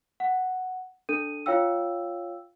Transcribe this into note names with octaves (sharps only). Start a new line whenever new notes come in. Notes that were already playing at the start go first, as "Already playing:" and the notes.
F#5
D4 A4 D#7
F4 C#5 F5 G5 E6